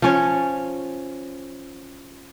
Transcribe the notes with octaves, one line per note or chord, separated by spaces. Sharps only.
F3 C#4 C#5